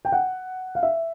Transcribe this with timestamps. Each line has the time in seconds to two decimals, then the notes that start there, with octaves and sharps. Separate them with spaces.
0.05 G5
0.12 F#5
0.75 F5
0.83 E5